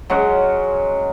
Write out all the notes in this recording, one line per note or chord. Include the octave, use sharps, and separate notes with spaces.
F#3 G#3 C#4 F#5